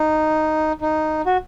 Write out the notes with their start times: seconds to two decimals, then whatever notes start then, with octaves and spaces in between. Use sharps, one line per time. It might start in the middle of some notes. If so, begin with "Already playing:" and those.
Already playing: D#4
0.81 D#4
1.26 F#4